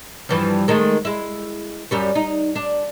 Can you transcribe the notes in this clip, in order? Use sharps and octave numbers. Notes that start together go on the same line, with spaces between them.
G2 E3 F3
D#3 G#3 A3
G#3 E4
F#2 G3 C#4
D#4
D4